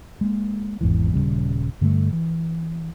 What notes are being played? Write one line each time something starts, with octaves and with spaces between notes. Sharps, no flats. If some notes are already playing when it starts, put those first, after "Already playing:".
G#3 A#3
G#1 E2 G#2 E3
D#1 C#2 C#3 G3
G2 D3 G3 A3
E3